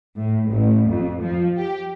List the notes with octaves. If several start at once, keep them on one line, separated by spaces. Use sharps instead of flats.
A2
A1
F2
F3
G4